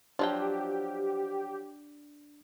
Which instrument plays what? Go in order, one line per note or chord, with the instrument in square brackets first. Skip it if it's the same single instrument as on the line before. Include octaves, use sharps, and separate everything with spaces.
[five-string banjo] F3 F#3 G5 [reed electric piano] D4 [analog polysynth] G4